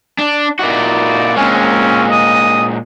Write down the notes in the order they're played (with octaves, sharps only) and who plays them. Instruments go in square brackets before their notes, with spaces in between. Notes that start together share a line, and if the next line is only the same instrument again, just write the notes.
[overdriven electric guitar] D4
[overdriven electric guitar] A#2 F#4 [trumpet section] D#4 E4 D5
[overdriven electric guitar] A#2 G#3 [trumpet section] C4 C#4
[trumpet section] D#5 D#6